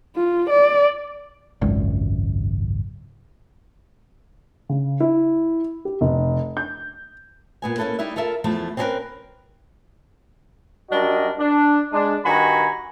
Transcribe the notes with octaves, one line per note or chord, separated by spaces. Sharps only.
F4
D5
G#1 C#2 F#2
C#3
E4
G4
F1
G6
A#2 B3 G#5
A#3 C#4 E4 A4 B4
G3 D#4 E4 E5
F4 A4 A#4 E5
E2 F3 A3 E4 A4
C4 C#4 E4 G4 A#4 B4
F#2 G3 D4 F#4 A#4 D#5
D4
G#3 D4
G2 D#3 F#4 G#5 A#5 B5